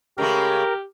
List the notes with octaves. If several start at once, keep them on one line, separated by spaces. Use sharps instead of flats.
C#3 G#3 A3 G4 A#4